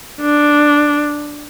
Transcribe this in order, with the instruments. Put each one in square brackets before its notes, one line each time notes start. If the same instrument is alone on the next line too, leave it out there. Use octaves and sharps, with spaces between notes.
[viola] D4